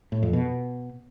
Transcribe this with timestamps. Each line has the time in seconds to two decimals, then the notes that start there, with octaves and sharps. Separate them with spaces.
0.12 A2
0.23 F2
0.33 B2